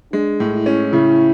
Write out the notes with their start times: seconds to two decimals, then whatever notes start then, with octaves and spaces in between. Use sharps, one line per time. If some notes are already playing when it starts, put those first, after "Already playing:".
0.13 G#3 D4
0.40 A2
0.53 E4
0.66 C#4
0.93 C#3 E4